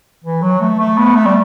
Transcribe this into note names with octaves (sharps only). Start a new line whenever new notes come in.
E3
F#3
A3
A3
B3
A3
G3